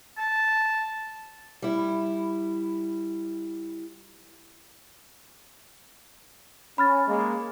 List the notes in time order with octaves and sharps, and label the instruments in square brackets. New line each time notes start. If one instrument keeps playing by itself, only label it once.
[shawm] A5
[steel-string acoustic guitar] G3 E4
[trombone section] C#4 [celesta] B5 F6 A6
[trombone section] G#3 A#3